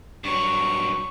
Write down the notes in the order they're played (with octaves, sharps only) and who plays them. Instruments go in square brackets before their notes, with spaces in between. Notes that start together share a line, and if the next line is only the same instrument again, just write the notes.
[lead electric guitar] G2 F#3 [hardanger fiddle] C#6